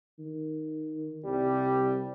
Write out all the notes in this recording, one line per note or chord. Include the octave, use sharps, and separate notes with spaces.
D#3
C2 G3